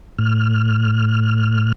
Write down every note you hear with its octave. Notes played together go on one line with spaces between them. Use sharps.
A2 F6